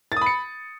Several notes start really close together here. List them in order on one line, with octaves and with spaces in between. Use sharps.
A6 D#6 B5 C#7